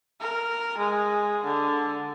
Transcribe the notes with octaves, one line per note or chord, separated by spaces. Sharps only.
A#4
G#3
D3